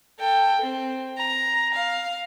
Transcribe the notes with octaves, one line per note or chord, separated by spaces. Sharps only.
A4 G5
C4
A#5
F5